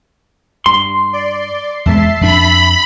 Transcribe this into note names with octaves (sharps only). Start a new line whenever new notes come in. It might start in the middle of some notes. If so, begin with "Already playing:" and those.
G2 C6
D5
E2 G#3 E5 A5 C7
F2 D4 B5